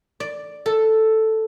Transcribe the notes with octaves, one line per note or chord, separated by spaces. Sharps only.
D5
A4